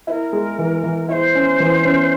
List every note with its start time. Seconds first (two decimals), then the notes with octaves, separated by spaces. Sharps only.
0.07 E4 C5
0.11 A#4
0.32 G#3
0.59 E3
0.83 E3
1.08 E4 C5 C#5
1.35 C#4
1.60 E3
1.85 C#4